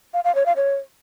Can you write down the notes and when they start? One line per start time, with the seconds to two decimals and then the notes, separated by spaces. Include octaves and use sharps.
0.14 F5
0.24 F5
0.35 C#5
0.46 F5
0.57 C#5